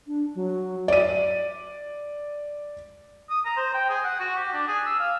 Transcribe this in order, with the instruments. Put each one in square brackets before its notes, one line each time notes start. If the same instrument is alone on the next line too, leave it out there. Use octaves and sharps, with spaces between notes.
[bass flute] D4
F#3
[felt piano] D5 D#7
[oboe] D#6
A#5
C5
G5
G#4
F#5
F#4
G4
D4
G#4
E6
F5